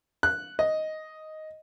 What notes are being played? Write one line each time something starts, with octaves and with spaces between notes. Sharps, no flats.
F#6
D#5